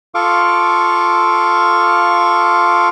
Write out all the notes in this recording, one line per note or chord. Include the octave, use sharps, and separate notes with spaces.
F4 A4 F5 C#6 D6